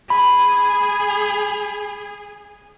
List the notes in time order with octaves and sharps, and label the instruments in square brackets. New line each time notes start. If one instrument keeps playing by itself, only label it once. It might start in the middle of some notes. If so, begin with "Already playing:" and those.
[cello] G#4 [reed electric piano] B5